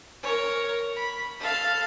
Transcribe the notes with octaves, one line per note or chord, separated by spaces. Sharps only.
A#4 C#5
B5
A4 F5